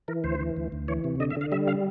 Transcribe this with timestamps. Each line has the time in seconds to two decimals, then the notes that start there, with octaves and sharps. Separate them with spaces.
0.08 E3 A#4
0.24 D2 C5
0.40 E3
0.56 D2
0.72 D2
0.88 E3 C#5
1.04 C3
1.20 D3 D#5
1.30 E5
1.36 D3 F5
1.52 G3 E5
1.67 F5